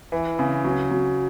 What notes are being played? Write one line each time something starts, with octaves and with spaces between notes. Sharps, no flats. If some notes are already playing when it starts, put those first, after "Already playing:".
E3
C#3
F#3
F#3